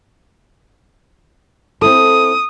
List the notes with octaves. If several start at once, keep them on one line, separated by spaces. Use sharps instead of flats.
C4 E4 A4 D#6